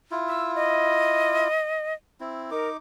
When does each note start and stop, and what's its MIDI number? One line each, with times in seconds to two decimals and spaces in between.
0.11 1.48 64
0.11 1.48 65
0.28 0.52 88
0.56 1.94 75
2.20 2.50 60
2.20 2.50 64
2.51 2.77 63
2.51 2.69 70
2.51 2.77 86